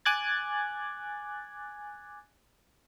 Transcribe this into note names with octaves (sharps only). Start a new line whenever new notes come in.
G#5 D6 F#6 G#6 A6